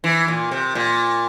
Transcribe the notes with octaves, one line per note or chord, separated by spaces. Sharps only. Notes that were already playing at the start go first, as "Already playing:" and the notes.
E3
A#2
C3
A#2